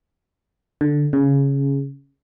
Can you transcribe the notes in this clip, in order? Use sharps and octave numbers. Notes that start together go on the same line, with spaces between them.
D3
C#3